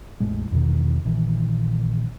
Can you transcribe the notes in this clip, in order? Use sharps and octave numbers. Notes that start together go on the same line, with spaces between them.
E1 A1 A2 G#3
A#1 E2 B2 D#3
A#1 A#2 D#3 E3